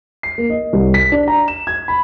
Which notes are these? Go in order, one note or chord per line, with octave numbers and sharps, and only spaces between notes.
C7
A#3
D#5
C2
B6
D4
A#5
E7
G#6
B5